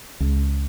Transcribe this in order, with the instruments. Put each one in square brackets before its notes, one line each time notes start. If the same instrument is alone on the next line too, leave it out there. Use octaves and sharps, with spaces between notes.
[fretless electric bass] C#2